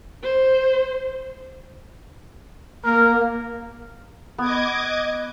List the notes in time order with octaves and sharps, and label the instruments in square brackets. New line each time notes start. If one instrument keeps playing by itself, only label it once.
[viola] C5
[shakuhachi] A#3 [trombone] A#4
[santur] B3 [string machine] D#5 D6 G#6